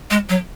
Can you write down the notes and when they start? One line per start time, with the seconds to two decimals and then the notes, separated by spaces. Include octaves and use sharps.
0.10 G#3
0.29 F#3